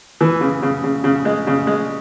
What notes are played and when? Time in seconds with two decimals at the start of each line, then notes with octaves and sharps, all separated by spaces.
0.21 E3
0.41 C#3
0.62 C#3
0.84 C#3
1.04 C#3
1.25 G#3
1.47 C#3
1.67 G#3